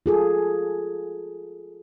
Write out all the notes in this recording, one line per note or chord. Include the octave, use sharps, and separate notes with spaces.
F4 G#4 A4